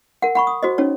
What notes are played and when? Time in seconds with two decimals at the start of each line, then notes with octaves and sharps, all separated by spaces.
0.22 A#4 F#5
0.35 F#5 B5 C#6
0.47 D#6
0.63 F#4 C5 D#5
0.78 C#4 D#4 C#5